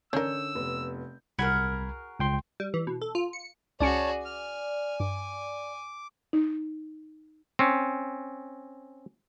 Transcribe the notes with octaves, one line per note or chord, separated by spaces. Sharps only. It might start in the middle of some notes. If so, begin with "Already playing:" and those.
D3 C#4 D4 A#4 E6 G6
F1 B3
C2 F#4 G#4 A#4 B5 G#6
C#2 G5 C6
G3
E3
B2
A4
F4
C#7
C#2 C#4 F#4 G#4 C#5 D5 A5 C#7
G#5 F6
G2 D6
D#4
C4 C#4